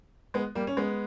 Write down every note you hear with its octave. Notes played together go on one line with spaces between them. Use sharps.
G#3 B3
G3 A#3
C#4
G#3 B3